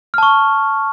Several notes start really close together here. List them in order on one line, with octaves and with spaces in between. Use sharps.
F6 A5 C#6